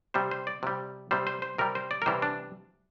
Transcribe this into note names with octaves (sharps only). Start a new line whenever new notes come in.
C3 G3 C5
C5
D5
C3 G3
C3 G3 C5
C5
C5
C3 G3 A#4
C5
D5
A#4
C3 E3 G3 C5
D4